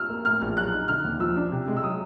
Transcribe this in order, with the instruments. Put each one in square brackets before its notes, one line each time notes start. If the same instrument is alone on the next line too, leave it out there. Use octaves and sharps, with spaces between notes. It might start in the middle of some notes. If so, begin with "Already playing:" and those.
Already playing: [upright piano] E6 F6
[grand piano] A#3
[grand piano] A2 [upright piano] F6
[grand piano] A#1 [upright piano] F6
[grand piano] F#3 [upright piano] F#6
[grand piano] D#4
[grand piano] D3 [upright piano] F6
[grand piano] D#2
[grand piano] F3 [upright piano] E6
[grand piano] D4
C3
G#3
[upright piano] E6
[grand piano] F#3 [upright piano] D#6